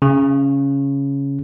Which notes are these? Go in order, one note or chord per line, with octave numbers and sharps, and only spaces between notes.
C#3